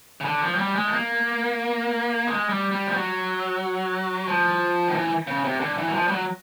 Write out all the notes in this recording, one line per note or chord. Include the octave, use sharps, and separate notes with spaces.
C#3
D3
F3
F#3
G3
G#3
A3
A#3
G#3
G3
G3
F3
F#3
F3
D#3
E3
C#3
C3
D3
E3
F#3
F3
G3
F#3